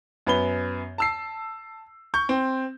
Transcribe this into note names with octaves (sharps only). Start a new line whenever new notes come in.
F#2 B3 B5 G7
A5 E6 C7
C#6 G6
C4